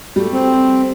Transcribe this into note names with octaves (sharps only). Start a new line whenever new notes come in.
G3 A3
C4